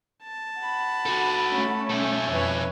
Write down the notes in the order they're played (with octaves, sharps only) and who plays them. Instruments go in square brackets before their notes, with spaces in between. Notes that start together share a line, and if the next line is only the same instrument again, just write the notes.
[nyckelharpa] A5
[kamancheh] F#5 B5
[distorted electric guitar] F#4 A4
[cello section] A3 C#4
[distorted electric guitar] B2 A4 [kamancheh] E5 G#5
[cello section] F2 [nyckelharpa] B4 C#5